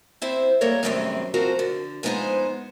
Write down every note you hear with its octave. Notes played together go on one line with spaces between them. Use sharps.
C4 E4 C5
G3 A#3 A4 A#4 C#5
F#2 C3 D#3 G3 A3 C4
F3 C4 F#4 A#4 C5
D3
F3 G#3 B3 D#4 G#4 C5